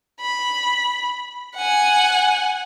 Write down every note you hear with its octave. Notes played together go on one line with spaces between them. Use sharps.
B5
F#5 G#5